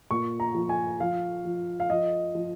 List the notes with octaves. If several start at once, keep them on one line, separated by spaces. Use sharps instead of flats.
A#2 C#6
A#5
F3
G#5
F3 F5
F3
F5
F3 D#5
F3